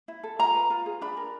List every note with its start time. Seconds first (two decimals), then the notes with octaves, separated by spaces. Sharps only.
0.08 E4
0.23 A4
0.39 F4 A#5
0.55 B4
0.70 F4
0.86 G#4
1.01 D4 B5
1.17 A#4